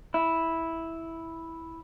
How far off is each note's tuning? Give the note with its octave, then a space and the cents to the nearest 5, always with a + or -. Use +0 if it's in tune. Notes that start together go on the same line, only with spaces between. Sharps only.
E4 -5